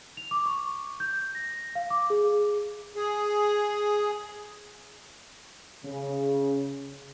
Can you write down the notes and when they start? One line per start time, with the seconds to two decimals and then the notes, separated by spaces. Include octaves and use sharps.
0.17 F7
0.31 D6
0.46 C#6
1.00 G6
1.35 A#6
1.75 F5
1.90 D6
2.10 G#4
2.96 G#4
5.85 C#3